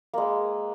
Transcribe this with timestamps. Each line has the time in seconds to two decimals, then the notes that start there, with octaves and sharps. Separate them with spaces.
0.13 A#3
0.18 G#3
0.22 B4